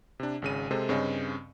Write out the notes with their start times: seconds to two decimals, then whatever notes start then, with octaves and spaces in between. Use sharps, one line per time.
0.20 C3 D4
0.42 G#1 C#3 D#7
0.71 C3 G#3 A4 C5
0.89 G2 C#3 C4 C#4 D#5